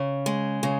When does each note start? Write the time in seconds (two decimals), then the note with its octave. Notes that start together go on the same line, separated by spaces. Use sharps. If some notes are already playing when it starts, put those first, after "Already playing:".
Already playing: C#3
0.26 G#3
0.63 C#3